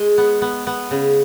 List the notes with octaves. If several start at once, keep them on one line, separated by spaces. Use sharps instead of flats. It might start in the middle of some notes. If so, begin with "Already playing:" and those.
Already playing: G#3
B3
B3
B3
C#3